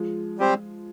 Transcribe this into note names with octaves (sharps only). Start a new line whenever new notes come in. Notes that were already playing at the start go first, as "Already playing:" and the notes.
Already playing: F3 G#3
G3 C4 G4 C5